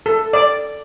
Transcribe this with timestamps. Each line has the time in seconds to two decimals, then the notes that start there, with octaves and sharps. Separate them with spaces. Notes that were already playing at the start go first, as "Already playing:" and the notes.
0.06 A4
0.33 D5